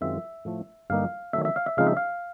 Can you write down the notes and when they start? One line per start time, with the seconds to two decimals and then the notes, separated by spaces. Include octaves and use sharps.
0.01 F#2 D#3 G#3 C4 F4 E5
0.45 A2 F3 A3
0.90 G2 D3 G3 A#3 D#4 F5
1.33 D#3 F#3 A3 E5
1.45 E5
1.56 F5
1.66 E5
1.77 C#3 F3 G#3 C4 D#4 F5
1.87 E5
1.97 F5